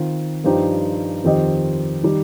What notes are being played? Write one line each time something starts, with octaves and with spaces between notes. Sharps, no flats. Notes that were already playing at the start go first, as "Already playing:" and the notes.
Already playing: D#3 C4 F4
G2 F3 D#4 G4 C5
F2 D#3 C4 G4 D#5
D#3 G3 D#4